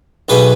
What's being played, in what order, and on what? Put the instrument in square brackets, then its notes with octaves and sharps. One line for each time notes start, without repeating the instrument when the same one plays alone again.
[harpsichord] B1 B2 A3 G#4 B4